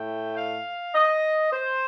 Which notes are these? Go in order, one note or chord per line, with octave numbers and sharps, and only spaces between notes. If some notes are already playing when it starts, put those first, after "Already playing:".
Already playing: A2 A3 G5
F5
D#5
C5